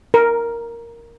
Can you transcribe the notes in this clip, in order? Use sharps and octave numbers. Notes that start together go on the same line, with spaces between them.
A#4